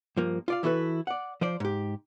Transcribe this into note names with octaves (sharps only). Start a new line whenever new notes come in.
G2 F3 A#3
F4 D5 F5
E3 E4 F#4 A4 B4
D5 F#5
F3 C5 D5
G#2 G4